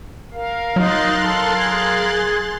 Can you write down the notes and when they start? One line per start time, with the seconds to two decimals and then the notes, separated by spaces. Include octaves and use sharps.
0.33 A#4 F5
0.76 F#3 D#4 C6 F#6 A6
1.22 A4
1.59 G#4 G#6